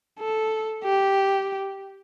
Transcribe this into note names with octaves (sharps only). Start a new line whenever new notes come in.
A4
G4